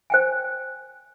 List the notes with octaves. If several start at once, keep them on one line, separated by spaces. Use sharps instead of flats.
C5 G5 G#5